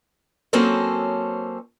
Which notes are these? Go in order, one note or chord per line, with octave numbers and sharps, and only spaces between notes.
F#3 A#3 C4 C#4 A4 C5